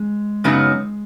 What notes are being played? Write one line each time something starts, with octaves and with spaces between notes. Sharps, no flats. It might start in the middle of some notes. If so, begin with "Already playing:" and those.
Already playing: G#3
F#2 C#3 F#3 B3 D#4